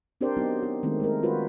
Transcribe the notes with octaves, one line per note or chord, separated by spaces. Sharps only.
C4 D4 G4 A#4 C5 D5
F#3 B3 D#4 G4
G4
D#3 G#3 A3 C4 E4
G#3 A3 A#4
F4 F#4 B4 C5